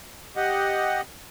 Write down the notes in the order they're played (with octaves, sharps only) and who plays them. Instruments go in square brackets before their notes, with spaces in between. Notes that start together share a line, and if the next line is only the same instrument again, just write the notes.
[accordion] G4 D#5 F#5